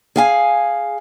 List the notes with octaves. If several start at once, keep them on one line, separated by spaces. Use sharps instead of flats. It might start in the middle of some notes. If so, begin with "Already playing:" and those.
G#4 F5 G#5